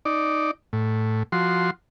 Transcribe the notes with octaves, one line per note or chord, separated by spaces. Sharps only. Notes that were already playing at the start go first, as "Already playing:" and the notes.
D#4 D5
A2
F3 F#4 C6